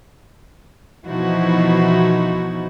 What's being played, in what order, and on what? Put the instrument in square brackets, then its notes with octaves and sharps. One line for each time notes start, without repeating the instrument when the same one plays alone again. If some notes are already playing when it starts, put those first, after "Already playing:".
[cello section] B2 E3 F3 D#4 E4 F#4